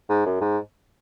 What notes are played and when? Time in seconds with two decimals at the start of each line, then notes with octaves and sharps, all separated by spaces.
0.09 G#2
0.26 F#2
0.41 G#2